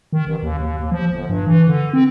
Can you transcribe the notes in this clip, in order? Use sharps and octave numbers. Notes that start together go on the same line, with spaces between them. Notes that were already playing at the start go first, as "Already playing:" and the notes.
D#3
A1
D#2
D#2
D#2
F3
G1
G2
E3
D3
C4